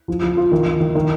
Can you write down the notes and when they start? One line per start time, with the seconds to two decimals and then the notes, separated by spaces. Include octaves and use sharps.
0.08 F3
0.22 F3
0.37 F4
0.52 D#3
0.66 D#3
0.80 D#3
0.95 D#3